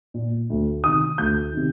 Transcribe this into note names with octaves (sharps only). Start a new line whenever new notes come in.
A#2
D2
C3 D#3 D#6
D2 G6
C3 D#3